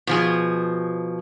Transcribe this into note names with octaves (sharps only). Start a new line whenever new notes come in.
B2 F3 G#4